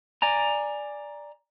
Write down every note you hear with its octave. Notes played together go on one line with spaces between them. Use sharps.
D5 G#5 A#5